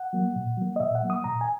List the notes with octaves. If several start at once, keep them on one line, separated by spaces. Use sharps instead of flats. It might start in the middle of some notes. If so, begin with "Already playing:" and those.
Already playing: F#5
F#3 A#3
A#2
F#3 A#3
D#5
A#2 E5
F#5
F#3 A#3
D#6
A#2 A#5
G#5